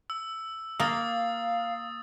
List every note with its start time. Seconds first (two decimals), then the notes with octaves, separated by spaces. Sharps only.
0.10 E6
0.80 A#3 F5 D#6 A6